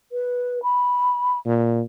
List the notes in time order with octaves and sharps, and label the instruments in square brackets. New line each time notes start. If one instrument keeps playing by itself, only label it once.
[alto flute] B4
B5
[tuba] A#2